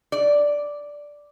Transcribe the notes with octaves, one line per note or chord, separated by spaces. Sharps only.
D5